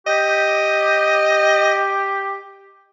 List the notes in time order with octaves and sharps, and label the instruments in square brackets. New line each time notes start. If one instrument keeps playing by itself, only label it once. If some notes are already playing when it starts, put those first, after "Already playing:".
[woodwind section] G4 [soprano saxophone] D#5